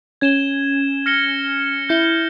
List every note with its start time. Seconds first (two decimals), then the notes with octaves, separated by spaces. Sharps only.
0.21 C#4 G#6 E7 G7
1.06 F6 A#6 C#7 G7
1.89 E4 G6 C#7 G7